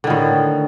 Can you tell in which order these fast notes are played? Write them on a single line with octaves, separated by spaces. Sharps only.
D3 D#3 A2